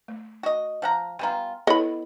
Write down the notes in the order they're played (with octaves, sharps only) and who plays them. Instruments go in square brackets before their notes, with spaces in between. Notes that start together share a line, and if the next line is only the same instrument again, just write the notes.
[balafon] A3
[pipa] F#4 D#5
F3 F#5 A#5
[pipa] G3 B3 F4 [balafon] G5 G#5 A#5
[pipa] B3 [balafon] E4 A4 C#5 [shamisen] D#5 B5